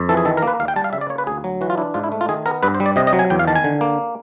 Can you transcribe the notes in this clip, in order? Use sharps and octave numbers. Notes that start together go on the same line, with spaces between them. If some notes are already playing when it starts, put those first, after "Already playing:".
Already playing: F2
E3 A4
G#4
D#3 A4
A#4
A#3
B4
D#2 F5
G5
G3 A5
F5
C#3 E5
D5
A#3 C#5
B4
D2 G#4
F#3
E3 F#4
F4
D4 E4
G#2 F4
E4
A3
F4
D#3 G#4
B3 A#4
G2 B4
C5
G3
D5
C3 D#5
D#5
F#3
G#5
E2 G5
F5
D#3 A5
G#5
D3
A#3